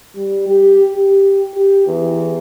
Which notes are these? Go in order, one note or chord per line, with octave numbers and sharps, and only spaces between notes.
G3
G4
G4
G4
E2